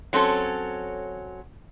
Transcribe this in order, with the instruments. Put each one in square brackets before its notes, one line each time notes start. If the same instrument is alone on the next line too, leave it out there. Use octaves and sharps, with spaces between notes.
[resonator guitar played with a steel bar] F#3 C4 C#4 A4